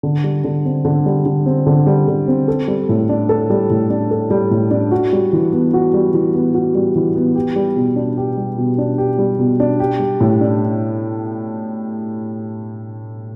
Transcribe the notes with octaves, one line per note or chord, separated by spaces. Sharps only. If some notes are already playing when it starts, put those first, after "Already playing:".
D3
G3
D3
C4
D3
G3
D3
C4
D3
G3
D3
C4
A4
G3
A2
D4
A4
G3
A2
D4
A4
G3
A2
D4
F#4
G3
E3
B3
F#4
G3
E3
B3
F#4
G3
E3
B3
G4
G3
B2
D4
G4
G3
B2
D4
G4
G3
B2
D4
G4
G3
A2
D4